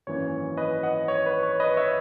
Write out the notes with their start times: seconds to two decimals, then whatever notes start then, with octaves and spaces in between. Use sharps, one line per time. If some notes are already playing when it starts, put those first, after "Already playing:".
0.07 G#1 F#2 E3 A#3 C#4 C#5
0.57 B4 D#5
0.83 D#5 F#5
1.08 C#5
1.26 B4
1.43 C#5
1.60 B4 D#5
1.77 C#5 E5